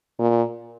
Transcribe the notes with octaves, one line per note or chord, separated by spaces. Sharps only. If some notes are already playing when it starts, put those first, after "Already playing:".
A#2